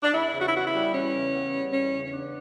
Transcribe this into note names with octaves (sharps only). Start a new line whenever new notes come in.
D4
E2 E4
C#3
F#4
E4
B3 F#4
E4
G3
E2 C#4
C#3
B3
G3
E2 C#4
C#3
C#4
B3 D4